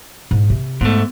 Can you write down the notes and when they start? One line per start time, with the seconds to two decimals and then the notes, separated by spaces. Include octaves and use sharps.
0.31 G#2
0.50 C3
0.81 G#2 A3 B3